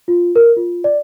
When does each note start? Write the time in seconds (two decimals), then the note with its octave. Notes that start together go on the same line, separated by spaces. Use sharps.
0.08 F4
0.36 A#4
0.57 F4
0.84 D5